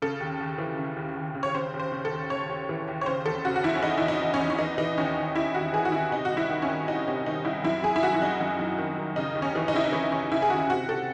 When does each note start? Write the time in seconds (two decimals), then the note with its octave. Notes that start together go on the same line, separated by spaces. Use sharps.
0.02 C#3 A4
0.20 D#2
0.40 D#2
0.58 E3
0.77 C#3
0.96 D#2
1.17 D#2
1.35 C#3
1.43 C#5
1.55 C#3 C5
1.74 D#2
1.80 C5
1.92 C#3
2.05 A4
2.11 D#2
2.30 C#3 C#5
2.49 D#2
2.69 E3
2.88 D#2
3.01 C#5
3.06 C#3 C5
3.25 E2 A4
3.45 C#3 F#4
3.56 F#4
3.64 E2 E4
3.75 C#4
3.82 E2 D#4
3.98 E2 E4
4.08 D#4
4.21 E2
4.34 C#4
4.40 E2
4.50 C#4
4.59 E3 D#4
4.78 E3 D#4
4.97 D#2 C#4
5.17 D#2
5.36 D#2 E4
5.54 D#2 F#4
5.73 E3 G#4
5.85 F#4
5.92 D#2 E4
6.11 C3 D#4
6.25 F#4
6.30 C2
6.37 E4
6.50 D#3
6.62 C#4
6.68 D#3
6.88 C2 D#4
7.07 C3 C#4
7.26 D#3 D#4
7.45 C2 E4
7.64 F#2 E4
7.83 F#2 G#4
7.96 E4
8.02 D#3 F#4
8.14 E4
8.22 F#2 D#4
8.40 F#2
8.59 F#2
8.78 D#3
8.98 D#3
9.16 C#3 D#4
9.35 D#2
9.42 C#4
9.55 E3
9.68 D#4
9.73 C#3 E4
9.84 D#4
9.92 E3 C#4
10.12 C#3 C#4
10.32 C#3 E4
10.42 G#4
10.50 D#2 F#4
10.69 C3 F#4
10.88 C3 A4